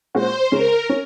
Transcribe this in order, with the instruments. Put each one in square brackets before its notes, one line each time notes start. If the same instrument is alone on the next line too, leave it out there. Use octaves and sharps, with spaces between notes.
[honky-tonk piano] A#2 G#3 C#4 F#4 [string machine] C5
[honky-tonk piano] C#3 G#3 C#4 [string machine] A#4
[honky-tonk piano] C#4